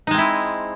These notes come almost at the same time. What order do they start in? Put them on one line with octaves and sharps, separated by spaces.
D#4 G#3 C4 E4